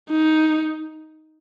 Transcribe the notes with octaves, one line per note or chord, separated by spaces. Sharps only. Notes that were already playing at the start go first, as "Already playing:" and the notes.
D#4